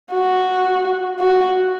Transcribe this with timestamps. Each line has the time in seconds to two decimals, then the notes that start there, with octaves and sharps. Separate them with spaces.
0.12 F#4
1.19 F#4